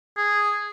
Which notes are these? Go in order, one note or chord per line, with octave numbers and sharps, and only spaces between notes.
G#4